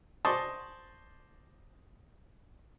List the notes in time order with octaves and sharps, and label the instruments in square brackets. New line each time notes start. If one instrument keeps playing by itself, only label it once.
[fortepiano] C5 D5 D#5 A5 C6 C#6